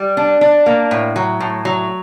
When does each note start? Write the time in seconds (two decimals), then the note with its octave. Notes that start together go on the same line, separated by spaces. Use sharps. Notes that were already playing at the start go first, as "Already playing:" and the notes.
Already playing: G3
0.17 D4
0.41 D4
0.66 A#3
0.91 A2
1.16 F#3
1.40 A2
1.65 F#3